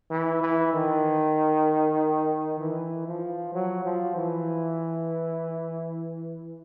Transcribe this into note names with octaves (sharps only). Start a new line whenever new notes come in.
E3
E3
D#3
E3
F3
F#3
F3
E3